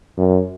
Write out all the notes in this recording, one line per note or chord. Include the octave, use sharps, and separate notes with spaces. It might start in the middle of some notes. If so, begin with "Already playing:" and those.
F#2